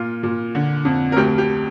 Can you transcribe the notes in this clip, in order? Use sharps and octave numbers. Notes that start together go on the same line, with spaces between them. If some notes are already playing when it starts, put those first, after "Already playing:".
Already playing: A#2 F4
A#2
D3
F2
A#4
D2 G4
G4